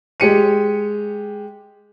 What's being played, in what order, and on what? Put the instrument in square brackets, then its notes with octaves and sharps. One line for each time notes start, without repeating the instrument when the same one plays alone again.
[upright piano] G#3 G4 C#7 D#7